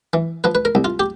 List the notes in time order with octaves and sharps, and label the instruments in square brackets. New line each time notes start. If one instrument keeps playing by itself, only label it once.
[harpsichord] E3
F3 B4
B4
A#4
C2
F4
G4